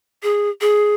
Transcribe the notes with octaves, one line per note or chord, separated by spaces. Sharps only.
G#4
G#4